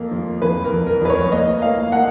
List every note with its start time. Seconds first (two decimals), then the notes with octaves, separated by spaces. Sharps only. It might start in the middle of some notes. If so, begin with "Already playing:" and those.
Already playing: F2 A#3
0.11 F3
0.41 F2 B4
0.64 A#4
0.72 F2
0.87 A#4
1.01 F2 B4
1.10 C#5
1.32 A#3 D#5
1.62 A#3 F5
1.92 A#3 F#5